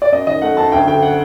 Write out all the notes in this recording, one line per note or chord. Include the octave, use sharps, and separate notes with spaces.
D5
F#2 D#5
D#3 D#5
A3 F#5
F#2 A5
D2 G5
D3 G5
F#5